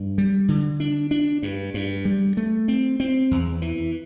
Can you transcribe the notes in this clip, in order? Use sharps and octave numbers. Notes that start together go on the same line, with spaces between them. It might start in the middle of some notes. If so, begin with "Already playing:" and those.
Already playing: G2
G3
D3
D4
D4
G2
G2
G3
A3
C4
C4
E2
E3